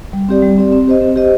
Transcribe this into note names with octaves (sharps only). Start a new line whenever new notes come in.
G3
C4 G4 D5
G3
C4 G4 D5
C4
G4 C5 D#5
C4
G4 C5 D#5